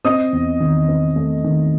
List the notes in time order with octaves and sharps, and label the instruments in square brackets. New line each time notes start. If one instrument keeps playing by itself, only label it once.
[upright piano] C4 D#5 D#6
E2
D#3
C4
A3
D#3